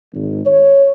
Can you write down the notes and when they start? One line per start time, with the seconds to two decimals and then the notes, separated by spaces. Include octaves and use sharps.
0.13 G#1
0.46 C#5